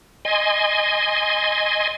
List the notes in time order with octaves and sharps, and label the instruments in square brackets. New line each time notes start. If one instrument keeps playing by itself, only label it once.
[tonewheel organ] D#5 G#5 C6